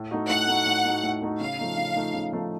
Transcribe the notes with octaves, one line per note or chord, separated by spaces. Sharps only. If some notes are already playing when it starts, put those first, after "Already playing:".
Already playing: A2
A3 D#4 F#4
A2 F#5
A3 D#4 F#4
A2
A3 D#4 F#4
A2
A3 D#4 F#4
C#3 F5
F3 A3 D#4
C#3
F3 A3 D#4
C#3
F3 A3 D#4